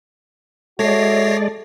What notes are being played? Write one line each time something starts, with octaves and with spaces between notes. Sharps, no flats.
G#3 F#4 A4 C#5 D5 E5 A#6 C7